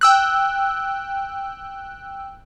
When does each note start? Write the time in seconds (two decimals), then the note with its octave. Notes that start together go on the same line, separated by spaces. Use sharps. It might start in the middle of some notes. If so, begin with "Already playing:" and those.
0.01 G5 E6 F#6